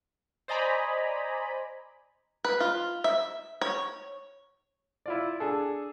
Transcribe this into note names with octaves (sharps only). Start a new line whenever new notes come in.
C5 D5 D#5 G#5 A#5 B5
B4
F4
E5
C#5
E4 F4 D5
D4 G#4 A4